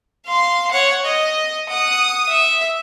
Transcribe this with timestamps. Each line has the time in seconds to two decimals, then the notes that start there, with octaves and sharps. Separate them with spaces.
0.27 F5 C6
0.71 C#5 F#5
1.05 D#5
1.70 F#5 D#6
2.29 E5